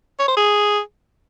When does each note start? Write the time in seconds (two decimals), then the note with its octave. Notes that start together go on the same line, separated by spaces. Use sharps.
0.19 C#5
0.28 C5
0.37 G#4